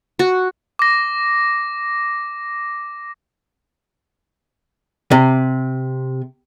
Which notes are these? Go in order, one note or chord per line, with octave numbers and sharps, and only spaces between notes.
F#4
D6 A#6
C3